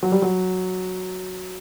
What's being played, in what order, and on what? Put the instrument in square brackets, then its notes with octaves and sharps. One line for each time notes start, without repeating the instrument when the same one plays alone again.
[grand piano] F#3
G3
F#3